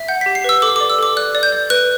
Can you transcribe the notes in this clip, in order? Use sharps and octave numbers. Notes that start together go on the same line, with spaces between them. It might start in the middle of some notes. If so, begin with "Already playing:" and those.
Already playing: E5
F#5 G6
B6
G4
C7
B4 E6
A4 D6
D6
D5
E6
A4 D6
D5 F#6
D5
G6
D5
B4 F#6